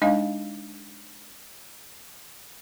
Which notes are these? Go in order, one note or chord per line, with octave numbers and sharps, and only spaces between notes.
G#3 D4 D#4 D#5 F5 G#5